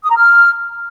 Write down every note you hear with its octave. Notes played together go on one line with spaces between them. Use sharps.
D#6
A#5
F6